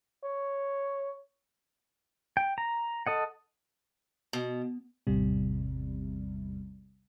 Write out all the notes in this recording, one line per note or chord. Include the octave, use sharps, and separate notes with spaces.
C#5
G5
A#5
A4 D#5 F#5
B2
A1 E2 C3 G3